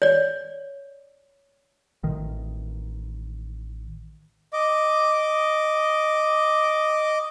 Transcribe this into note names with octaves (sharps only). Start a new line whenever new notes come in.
C#5 D5
A1 D#3
D#5 D6